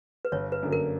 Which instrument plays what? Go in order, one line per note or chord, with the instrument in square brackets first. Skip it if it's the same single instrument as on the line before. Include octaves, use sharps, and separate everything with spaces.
[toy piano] B4
[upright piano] G1 [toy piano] C#5
[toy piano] B4
[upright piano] F#2 D3 A#3
[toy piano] A#4